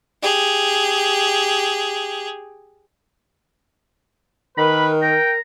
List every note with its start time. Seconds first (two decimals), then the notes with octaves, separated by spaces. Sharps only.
0.22 G4 G#4
4.58 D#3 A#4 B4 B5
5.02 G5 A#5